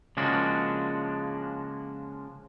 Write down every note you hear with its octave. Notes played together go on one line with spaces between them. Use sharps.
C#3 F3 G#3 A#3 D4 F#4